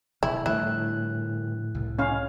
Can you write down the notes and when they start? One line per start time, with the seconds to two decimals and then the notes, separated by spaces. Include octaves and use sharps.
0.23 D1 B2 F3 E4
0.46 A2 D3 F3 G3 E4 F#6
1.75 C2
1.99 C#4 F5